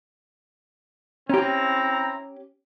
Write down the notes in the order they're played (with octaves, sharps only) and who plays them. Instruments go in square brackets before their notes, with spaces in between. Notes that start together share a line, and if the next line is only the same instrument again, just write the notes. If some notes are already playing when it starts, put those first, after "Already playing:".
[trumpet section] C4 E4 A#5 [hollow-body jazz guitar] C#4 G4